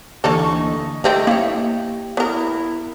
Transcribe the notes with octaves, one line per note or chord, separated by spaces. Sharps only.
D2 D3 E3 A#3 D#4 A4 C#6
D#5
A3 C4 D#4 G4
A#3 E4 C#5
B3 E4 A#4